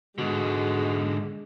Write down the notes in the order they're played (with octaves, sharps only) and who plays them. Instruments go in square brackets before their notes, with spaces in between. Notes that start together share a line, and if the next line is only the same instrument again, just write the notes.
[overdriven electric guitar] G#2 D3 [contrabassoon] B2 [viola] G#3